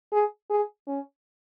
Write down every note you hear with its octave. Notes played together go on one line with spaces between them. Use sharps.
G#4
G#4
C#4